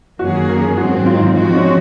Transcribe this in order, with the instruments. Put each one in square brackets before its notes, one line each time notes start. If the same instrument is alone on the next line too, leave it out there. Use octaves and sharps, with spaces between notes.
[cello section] F#2 D#3 A#3 C#4 G#4 [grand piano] F#4
[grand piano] A#4
[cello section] G#2 D#3 F#3 C4 [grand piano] F#4
[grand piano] F4
D#4
F4
[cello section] F3 G#3 C4 F#4 [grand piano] D#4
[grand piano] C#4